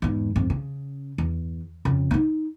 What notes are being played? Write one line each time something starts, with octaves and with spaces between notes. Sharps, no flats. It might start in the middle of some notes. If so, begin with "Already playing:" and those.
E2 G#2
F2 G#2
C#3
E2
F2 C#3
A#3 D#4